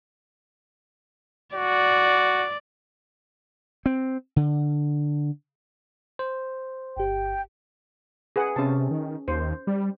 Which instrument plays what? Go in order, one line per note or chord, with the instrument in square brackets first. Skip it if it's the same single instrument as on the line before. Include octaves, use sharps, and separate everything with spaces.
[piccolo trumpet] F#4 [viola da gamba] D5
[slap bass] C4
D3
[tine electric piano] C5
[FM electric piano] G1 G4 [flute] G5
[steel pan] G#4 B4 F#5
[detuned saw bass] C3 [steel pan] C#4 A5
[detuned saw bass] D#3
[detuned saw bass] D#2 [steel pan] C5
[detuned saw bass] G3